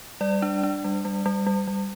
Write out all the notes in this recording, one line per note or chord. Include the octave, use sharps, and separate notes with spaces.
G3 D5
D4
D4
G3
G3
G3
G3
G3